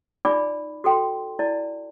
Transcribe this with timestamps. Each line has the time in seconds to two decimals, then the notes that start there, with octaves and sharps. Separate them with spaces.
0.25 D#4 F4 D5 G#5 B5 D6
0.84 F#4 A4 G5 C6
1.39 E4 D5 A5